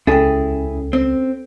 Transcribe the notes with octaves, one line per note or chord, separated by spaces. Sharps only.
C#2 C#4 E4 G#4 A4 G5
C4